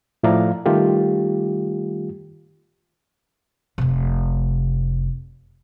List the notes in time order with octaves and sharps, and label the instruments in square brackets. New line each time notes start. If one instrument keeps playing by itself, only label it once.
[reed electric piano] A2 F3 E4 D5 F5 A#5
D#3 G3 A3 F4 G4
[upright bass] F1 C3